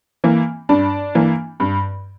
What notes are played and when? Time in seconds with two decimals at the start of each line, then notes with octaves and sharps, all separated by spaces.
0.24 E3 A#3
0.69 G2 D4
1.15 E3 A#3
1.60 G2